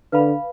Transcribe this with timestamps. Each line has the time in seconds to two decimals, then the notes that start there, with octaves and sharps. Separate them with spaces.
0.12 D3 B4 F5 B5